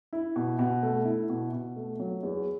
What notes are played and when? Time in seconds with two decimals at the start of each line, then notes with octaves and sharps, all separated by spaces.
0.13 E4
0.36 B2
0.59 B2
0.83 A3
1.05 E4
1.29 B2
1.53 B2
1.76 A3
1.99 F#3
2.23 E2